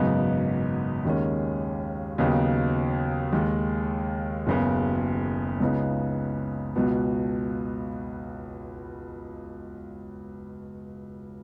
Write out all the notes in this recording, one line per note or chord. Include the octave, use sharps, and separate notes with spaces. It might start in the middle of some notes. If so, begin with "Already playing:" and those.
Already playing: G#1 F#2 C#3 B3 D#4
D#2 D#3 G#3 C#4
D#2 C#3 F#3 B3 D#4
D#2 D#3 G#3
F#1 F#2 C#3 B3
C#2 C#3 B3 D#4
C#2 B2 B3